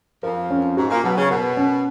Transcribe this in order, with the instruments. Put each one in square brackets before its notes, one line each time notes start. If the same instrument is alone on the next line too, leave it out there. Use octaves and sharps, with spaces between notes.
[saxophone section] F2 F3 [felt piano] A#4
[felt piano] C#4
[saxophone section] G#2 G#3 [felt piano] F#4
[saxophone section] A#2 A#3
[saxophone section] B2 B3 [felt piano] F#3
[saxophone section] C#3 C#4
[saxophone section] B2 B3 [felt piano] A#4
[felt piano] C#4